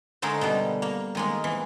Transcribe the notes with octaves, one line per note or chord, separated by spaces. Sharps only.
D3 G#3 A3 D#4 G#4 A#4
B2 D3 G3
A#3
D#3 G#3 A#3
E3